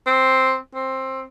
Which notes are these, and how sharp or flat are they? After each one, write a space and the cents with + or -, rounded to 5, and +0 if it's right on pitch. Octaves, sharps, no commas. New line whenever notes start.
C4 +5
C4 +15